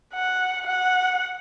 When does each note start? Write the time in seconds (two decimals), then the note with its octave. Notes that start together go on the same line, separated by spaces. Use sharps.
0.14 F#5
0.67 F#5